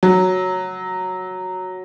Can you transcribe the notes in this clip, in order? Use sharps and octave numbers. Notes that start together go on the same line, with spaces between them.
F#3